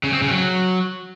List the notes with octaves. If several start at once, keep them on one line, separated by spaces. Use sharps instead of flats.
C#3
C4
C#3
F#3